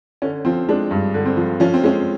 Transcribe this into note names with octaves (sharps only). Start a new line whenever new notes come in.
D3 C#4
F3 C4
G#3 D4
G2
D3
C4
F3
F3 C#4
C4
G#3 C#4